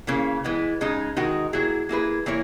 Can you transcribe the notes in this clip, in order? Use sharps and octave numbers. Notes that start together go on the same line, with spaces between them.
C#3 E3 A#3
E3 G#3 B3
C#3 G#3 D#4
D#3 G#3 D#4 F#4 A#4
F#3 A#3 E4 G#4
A#3 E4 G#4 B4
E3 A#3 E4 A#4 C#5